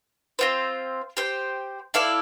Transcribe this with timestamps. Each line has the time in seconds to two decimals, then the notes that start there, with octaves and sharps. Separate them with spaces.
0.39 C4 F4 C5
1.17 G4 C5 G5
1.94 E4 A4 D5 F5